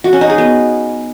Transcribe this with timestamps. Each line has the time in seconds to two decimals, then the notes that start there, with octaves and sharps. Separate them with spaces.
0.04 F#4
0.13 C#4
0.21 D#4
0.30 G#4
0.38 B3